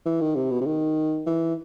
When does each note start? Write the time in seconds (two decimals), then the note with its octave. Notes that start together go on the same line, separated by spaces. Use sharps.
0.06 E3
0.21 D#3
0.35 C3
0.51 B2
0.61 C3
0.66 D#3
1.27 E3